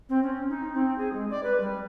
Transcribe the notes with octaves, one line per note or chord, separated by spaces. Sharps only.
C4
C#4
D#4
C4
G#4
G#3
D5
B4
G3